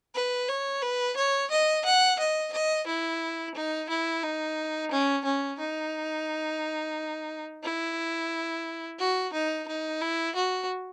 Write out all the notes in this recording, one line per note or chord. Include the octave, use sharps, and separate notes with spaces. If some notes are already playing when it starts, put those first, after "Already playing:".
B4
C#5
B4
C#5
D#5
F#5
D#5
D#5
E4
D#4
E4
D#4
C#4
C#4
D#4
E4
F#4
D#4
D#4
E4
F#4